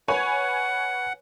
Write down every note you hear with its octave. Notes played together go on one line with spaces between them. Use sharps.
B4 C#5 F#5 G#5